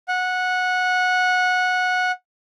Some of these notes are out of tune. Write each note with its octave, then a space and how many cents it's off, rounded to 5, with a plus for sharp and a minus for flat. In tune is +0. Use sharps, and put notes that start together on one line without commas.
F#5 -15